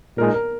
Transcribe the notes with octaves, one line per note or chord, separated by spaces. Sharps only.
A#2 G#3 D#4 A#4
A#4